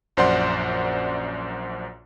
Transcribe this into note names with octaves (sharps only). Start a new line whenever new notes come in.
A#1 F#2 C5 D5 F#5 C6